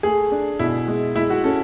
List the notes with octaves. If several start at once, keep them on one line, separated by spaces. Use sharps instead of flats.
A3 G#4
D4
B2 E4
G#3
G#3 E4
F#4
C#4 A4